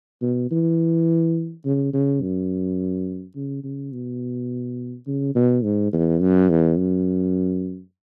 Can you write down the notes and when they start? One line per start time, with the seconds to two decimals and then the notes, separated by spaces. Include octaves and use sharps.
0.22 B2
0.51 E3
1.65 C#3
1.93 C#3
2.22 F#2
3.36 C#3
3.64 C#3
3.92 B2
5.07 C#3
5.35 B2
5.64 G#2
5.93 E2
6.21 F#2
6.50 E2
6.78 F#2